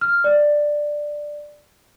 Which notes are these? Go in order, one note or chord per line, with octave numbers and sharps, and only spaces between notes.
F6
D5